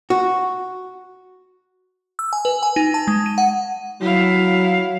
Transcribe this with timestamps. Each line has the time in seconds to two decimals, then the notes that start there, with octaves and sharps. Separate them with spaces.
0.10 F#4
2.19 E6
2.33 G#5
2.45 B4
2.63 G#5
2.76 D#4
2.94 A5
3.08 G#3
3.26 D#7
3.38 F#5
4.01 F#3 E4 F5